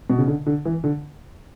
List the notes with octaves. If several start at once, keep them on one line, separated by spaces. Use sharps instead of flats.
B2
C#3
D3
D3
E3
D3